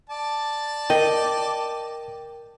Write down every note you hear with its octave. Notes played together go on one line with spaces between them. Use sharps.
D5 A5
A#4 D#5 G5